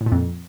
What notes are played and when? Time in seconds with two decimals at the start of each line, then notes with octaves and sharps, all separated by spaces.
0.01 A2
0.06 A#2
0.12 F2